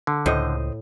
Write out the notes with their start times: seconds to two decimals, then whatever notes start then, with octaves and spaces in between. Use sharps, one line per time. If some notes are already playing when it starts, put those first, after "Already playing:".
0.07 D3
0.26 C#2 A2 C5 D#5